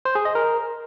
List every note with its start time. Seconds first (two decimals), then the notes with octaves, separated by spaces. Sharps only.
0.05 C5
0.15 G#4
0.25 D#5
0.35 A#4